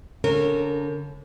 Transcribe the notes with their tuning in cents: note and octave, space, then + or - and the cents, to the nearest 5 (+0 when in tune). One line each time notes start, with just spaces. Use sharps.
D3 -35 C#4 -20 A#4 -25